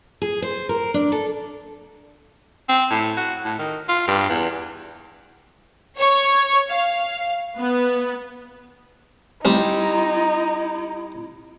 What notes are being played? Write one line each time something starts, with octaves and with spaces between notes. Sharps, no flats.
G#4
C5
A#4
D4
A4
C4
A2
F#4
A2
D#3
F4
G2
E2
C#5
F5
B3
G3 C4 D#4 E4